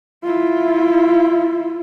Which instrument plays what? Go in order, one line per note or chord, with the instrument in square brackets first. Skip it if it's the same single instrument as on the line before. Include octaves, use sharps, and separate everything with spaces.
[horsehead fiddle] E4 F4